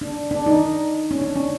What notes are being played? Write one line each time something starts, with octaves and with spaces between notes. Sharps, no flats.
D4
D4
D#4
C#4
D4
C#4